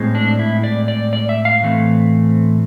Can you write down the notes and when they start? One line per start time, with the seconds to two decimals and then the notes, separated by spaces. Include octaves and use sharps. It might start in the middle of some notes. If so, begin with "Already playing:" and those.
Already playing: A2 G#3 C4
0.15 D4
0.39 E4
0.64 D5
0.88 D5
1.13 D5
1.29 E5
1.45 F5
1.62 A2 E3 A3 C4